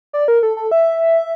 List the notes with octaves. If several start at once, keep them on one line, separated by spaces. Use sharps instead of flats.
D5
A#4
A4
A4
E5